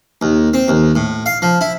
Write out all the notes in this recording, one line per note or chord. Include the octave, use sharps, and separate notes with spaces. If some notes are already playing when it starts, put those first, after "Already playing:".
D#2
C4
D#2
A2
F5
F3
E4